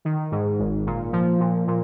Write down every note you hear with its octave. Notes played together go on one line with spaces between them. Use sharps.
D#3
G#2
G#1
A#2
F3
A#2
A#2